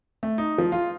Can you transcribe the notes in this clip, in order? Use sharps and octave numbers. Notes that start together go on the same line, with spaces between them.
A3
D#4
F3
F4